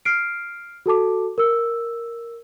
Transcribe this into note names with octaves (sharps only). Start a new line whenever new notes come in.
F6 C7 D7
F#4 A4 A5 D6
A#4 E6